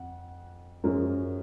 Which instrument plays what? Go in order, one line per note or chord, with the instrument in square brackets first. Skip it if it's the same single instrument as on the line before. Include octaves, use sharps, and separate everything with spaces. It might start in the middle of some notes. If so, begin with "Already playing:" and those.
Already playing: [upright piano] F2 F#5
F#2 F3 G#3 C#4 A#4